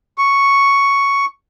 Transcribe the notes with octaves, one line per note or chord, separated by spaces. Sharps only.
C#6